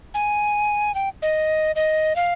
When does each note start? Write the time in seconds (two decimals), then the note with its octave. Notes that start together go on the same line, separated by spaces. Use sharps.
0.14 G#5
0.95 G5
1.22 D#5
1.76 D#5
2.16 F5